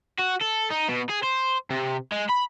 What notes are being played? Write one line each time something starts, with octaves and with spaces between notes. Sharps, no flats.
F#4
A4
D#4
B2
G#4
C5
C3
G#3
B5